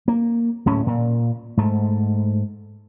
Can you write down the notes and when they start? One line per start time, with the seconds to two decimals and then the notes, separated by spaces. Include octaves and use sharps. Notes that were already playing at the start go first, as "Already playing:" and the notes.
0.08 A#3
0.66 D1 A2 C#4
0.87 A#2
1.57 G#2 A3